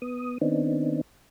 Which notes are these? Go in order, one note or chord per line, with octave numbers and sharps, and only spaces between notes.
B3 D#6
D#3 B3 C4 D4 D#4